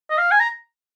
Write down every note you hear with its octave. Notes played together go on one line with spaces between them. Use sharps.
D#5
F5
G#5
A#5